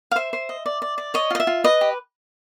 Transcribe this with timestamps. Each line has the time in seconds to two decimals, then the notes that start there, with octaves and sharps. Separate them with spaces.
0.11 F5
0.16 C5 E5
0.33 C5
0.49 D#5
0.66 D5
0.82 D5
0.98 D5
1.14 C#5 D#5
1.30 F4 D#5
1.40 E5
1.47 F4
1.64 B4 D#5
1.81 G4